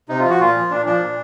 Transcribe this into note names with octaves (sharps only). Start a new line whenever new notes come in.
C3 D#4
F4
F3
F#4
A#2 F4
F3
A#2 D4
F3 D4
A#2